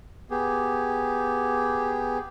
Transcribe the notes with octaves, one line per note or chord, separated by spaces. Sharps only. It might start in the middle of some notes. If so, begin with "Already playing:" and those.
B3 G4 G#4